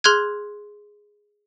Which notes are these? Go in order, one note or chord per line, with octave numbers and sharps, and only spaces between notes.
G#4 C6 F6 F#6 G#6